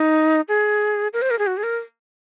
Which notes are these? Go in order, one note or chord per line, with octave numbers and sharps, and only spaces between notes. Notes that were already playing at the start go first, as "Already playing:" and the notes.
Already playing: D#4
G#4
A#4
C5
A#4
G#4
F#4
G#4
A#4